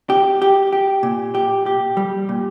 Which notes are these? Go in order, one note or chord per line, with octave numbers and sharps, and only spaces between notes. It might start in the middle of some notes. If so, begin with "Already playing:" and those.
G4
G4
G4
A#2
G4
G4
G3
A#2